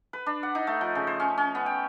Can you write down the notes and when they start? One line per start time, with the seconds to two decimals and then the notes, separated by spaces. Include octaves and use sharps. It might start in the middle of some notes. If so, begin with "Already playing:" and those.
0.13 B4
0.26 D4
0.43 F#5
0.55 D#4
0.67 A3
0.81 F3
0.95 C#3
1.07 C5
1.20 C#4
1.38 C#4
1.55 B3
1.66 G5